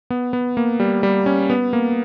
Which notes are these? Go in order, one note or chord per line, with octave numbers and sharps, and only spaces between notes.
B3
B3
A#3
G3
G3
C#4
B3
A#3